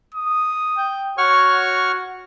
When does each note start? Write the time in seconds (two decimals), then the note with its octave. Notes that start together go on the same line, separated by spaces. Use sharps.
0.15 D#6
0.77 G5
1.18 F#4 C#5 F#5 C#6 F6